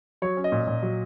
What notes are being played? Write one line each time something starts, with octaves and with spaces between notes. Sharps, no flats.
F#3 C#5
C#4
D#5
A#2
A#2
F#3